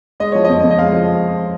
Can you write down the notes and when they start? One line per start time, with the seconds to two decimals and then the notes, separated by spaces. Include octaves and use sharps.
0.20 G#3 D#5
0.32 F3 C#5
0.45 F2 D#5
0.63 F2
0.71 D#5
0.78 G#3 F5
0.92 F3